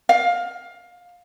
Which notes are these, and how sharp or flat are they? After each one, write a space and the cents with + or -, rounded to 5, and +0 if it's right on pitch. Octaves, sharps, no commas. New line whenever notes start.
F5 +15